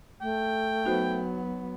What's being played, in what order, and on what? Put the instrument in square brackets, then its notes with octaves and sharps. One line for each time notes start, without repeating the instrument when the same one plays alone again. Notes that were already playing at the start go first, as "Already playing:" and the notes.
[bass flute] A3 [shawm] G5
[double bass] F#3 B3 [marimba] D#4 F#4 C5